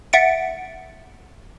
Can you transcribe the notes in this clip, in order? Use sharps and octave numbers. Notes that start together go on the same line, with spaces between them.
E5 F#5 A6 C#7 D7